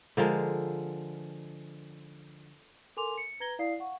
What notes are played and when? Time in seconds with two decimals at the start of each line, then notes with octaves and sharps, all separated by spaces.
0.17 D3 F3 G#3 A#4
2.97 A4 A#4 G#5 C6 D6 F7
3.18 C#7
3.40 B4 A#5 G#6 A#6 G7
3.59 E4 D5 F5 D#6 C7
3.79 F5 F#5 C#6